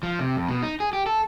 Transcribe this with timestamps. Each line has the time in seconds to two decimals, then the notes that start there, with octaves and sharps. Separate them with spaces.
0.03 F3
0.19 C3
0.36 F2
0.48 B2
0.62 D#4
0.80 G#4
0.93 G4
1.06 A4